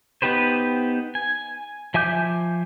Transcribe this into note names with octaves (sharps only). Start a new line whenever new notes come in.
B3 D#4 G4 B4 C5
G#5
F3 E5 G#5 D6 G6